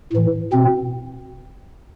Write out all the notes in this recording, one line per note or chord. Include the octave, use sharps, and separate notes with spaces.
A2 E3
B2 C4